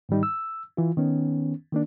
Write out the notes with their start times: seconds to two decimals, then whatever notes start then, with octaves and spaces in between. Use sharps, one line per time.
0.09 G#2 D#3 G3 D#4
0.23 E6
0.77 E3 F4
0.97 D#3 B3 C#4
1.72 D#3 A#3 D4